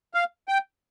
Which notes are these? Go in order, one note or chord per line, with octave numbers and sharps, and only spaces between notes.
F5
G5